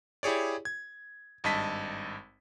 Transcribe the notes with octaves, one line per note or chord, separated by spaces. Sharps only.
E4 G4 G#4 C#5 D5
G#6
G#1 G2 D#5 A5 B6